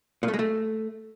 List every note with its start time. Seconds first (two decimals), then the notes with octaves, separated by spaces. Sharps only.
0.23 A#2
0.28 A3
0.34 G#3
0.39 A3